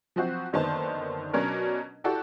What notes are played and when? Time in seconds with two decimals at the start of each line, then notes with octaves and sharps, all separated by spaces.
0.16 F3 F#3 C4 F#4
0.53 F#1 D3 D#3 B3 C5 A5
1.33 B2 F#3 C#4 D4 A#4
2.04 E4 F#4 G4 A4 D5